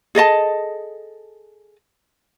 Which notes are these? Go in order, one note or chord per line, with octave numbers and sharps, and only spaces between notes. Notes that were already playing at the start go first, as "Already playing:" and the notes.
G#4 A4 D#5 A5